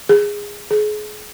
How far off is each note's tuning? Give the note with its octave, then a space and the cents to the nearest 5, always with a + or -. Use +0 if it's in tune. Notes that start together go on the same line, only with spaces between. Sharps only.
G#4 -15
G#4 +30